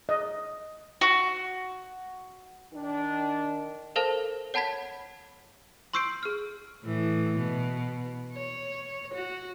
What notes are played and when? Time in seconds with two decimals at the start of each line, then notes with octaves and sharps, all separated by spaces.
0.09 D#5
1.01 F#4
2.73 D#3 D4
3.96 A4 A#4 C5 F5 A5
4.54 C#5 F#5 A5 B5 G#6 B6
5.94 C6 C#6 E6 G6 C7 D7
6.23 G#4 F6
6.83 A2 E3
7.38 B2
8.33 C#5
9.15 F#4